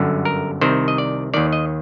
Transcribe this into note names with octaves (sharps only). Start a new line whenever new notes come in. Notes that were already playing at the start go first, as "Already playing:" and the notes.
Already playing: G1 F#2 D3
A#4
C2 C3 D#3 C5
D#5
D5
D#2 D#3 D5
D#5